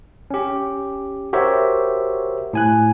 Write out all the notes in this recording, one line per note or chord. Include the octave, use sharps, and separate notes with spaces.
C#4 G4
F#4 G4 A#4 C5 C#5 E5
A2 G#5 F#6